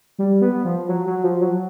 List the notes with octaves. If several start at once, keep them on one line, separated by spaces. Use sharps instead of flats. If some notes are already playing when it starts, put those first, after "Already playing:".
G3
B3
F3
F#3
F#3
F3
F#3